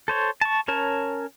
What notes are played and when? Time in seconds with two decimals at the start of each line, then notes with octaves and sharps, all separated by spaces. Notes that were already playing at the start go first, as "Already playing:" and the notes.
0.08 A4 C5 C#5
0.41 A5 C#6
0.68 C#4 A#4 C#5 A5